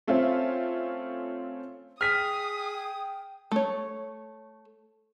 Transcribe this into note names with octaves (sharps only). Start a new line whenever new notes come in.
A3 C4 C#4 F4 E5
G#4 G5 D#6 F6 B6
A3 C#5